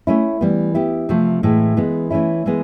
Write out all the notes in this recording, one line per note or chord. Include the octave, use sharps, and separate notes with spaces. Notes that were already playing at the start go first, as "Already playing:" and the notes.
A3 C#4 E4
E3 G3 B3
B3 E4 G4
C3 F3 A3
A2 E3 G#3
E3 G#3 B3
E3 A3 C#4 E4
E3 G#3 B3